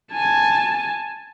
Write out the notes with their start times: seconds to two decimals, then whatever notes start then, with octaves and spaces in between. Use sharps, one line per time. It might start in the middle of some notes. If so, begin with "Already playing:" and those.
0.13 G#5 A5